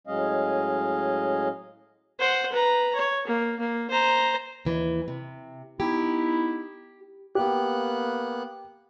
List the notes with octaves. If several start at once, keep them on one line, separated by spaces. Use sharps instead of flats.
A2 F#3 G#3 C#4 D#5 F5
C5 F#5
B4 A#5
C#5
A#3
A#3
C5 A#5
D#2 E3
C3
B3 D#4 E4 G4
A#3 B3 G4 F#6